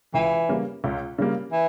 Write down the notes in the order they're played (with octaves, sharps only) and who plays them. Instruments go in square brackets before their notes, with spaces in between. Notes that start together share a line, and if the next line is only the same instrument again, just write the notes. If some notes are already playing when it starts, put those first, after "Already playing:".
[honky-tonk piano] C#2 [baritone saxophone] E3
[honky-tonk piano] C#3 G3 A#3
C#2
C#3 G3 A#3
[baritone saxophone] E3